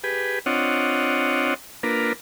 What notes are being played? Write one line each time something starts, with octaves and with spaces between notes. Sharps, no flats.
G4 G#4 B4
C4 D4 F4 C#5 D#5 F#5
A#3 D4 F4 A#4 B4